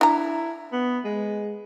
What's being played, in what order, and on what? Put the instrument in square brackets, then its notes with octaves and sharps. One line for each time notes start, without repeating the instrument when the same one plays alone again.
[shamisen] D4 A#5 [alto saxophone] E4
[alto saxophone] B3
G#3